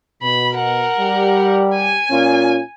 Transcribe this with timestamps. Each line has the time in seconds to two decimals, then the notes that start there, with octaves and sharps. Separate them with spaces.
0.23 B2 B5
0.55 A#4 F#5
0.97 G3 G4
1.75 G#5
2.10 A#2 C#4 F4